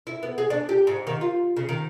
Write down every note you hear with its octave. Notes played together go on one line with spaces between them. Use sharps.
E4
B3
G#4
D4
G4
G#2
D#3
F4
C#3
D#3